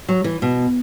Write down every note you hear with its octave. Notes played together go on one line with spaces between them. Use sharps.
F#3
E3
B2